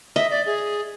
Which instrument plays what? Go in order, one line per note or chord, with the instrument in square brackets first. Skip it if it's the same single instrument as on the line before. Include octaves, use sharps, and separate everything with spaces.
[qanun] D#5 [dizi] E5
[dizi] D5
G#4